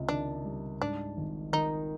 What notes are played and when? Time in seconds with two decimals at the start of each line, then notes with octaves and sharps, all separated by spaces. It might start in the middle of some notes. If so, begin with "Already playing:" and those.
Already playing: C#2 C3
0.09 D#3 D4
0.44 G3
0.82 G#2 D4
1.17 G#1
1.53 D#3 D#4